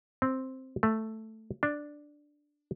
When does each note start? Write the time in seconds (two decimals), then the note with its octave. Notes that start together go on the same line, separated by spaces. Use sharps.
0.22 C4
0.83 A3
1.63 D4